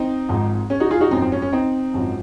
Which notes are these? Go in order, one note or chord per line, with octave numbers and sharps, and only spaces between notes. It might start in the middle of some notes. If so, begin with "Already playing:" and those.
Already playing: C4 D#4
G#1 G#2 F3
C#4
D#4 F#4
F4 G#4
D#4 F#4
G#1 F#2 F3 C4 D#4
C4
C#4
C#4
C4 D#4
G#1 F#2 F3